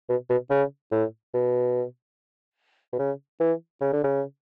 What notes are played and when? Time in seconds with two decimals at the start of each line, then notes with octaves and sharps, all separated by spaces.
0.09 B2
0.30 B2
0.50 C#3
0.92 A2
1.34 B2
2.93 B2
2.99 C#3
3.40 E3
3.81 C#3
3.93 D3
4.04 C#3